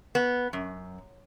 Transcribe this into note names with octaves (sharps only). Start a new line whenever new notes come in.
B3
F#2